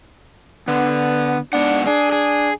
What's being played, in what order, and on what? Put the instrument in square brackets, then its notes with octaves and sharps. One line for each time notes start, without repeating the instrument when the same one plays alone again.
[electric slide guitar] D3 [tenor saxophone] B3
[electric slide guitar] G#2 B3 F#5 [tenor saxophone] D4
[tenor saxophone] D4 [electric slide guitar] G#4
[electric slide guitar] G#4